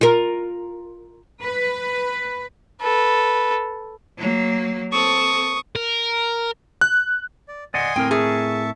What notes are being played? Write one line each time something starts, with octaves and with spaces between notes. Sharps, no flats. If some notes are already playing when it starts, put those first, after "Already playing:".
F4 A#4
B4
A4 B4
F#3 A#3
C4 A4 C#6 D#6
A#4
F#6
D5
D5 D#5 F#5 G#5 C6 D#6
A2 C4 A#4 G5
G#4 E5 A5 C#6